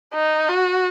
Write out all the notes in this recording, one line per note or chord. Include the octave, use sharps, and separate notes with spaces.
D#4
F#4